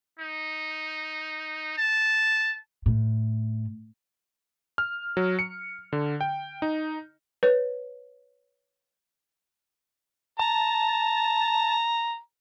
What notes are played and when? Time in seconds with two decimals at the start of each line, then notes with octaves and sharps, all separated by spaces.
0.19 D#4
1.78 A5
2.86 A2
4.78 F6
5.17 F#3
5.39 C#7
5.93 D3
6.21 G5
6.62 D#4
7.43 B4 C#5
10.39 A5 A#5